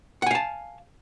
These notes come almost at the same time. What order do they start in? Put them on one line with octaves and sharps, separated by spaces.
F#5 G#5 F5 A5